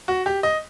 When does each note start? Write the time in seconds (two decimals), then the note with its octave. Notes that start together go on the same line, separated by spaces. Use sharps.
0.08 F#4
0.26 G4
0.43 D#5